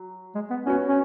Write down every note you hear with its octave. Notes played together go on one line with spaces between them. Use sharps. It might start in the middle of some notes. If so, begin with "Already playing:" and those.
Already playing: F#3
G#3
B3
B3 C#4 F#4 C#5
C#4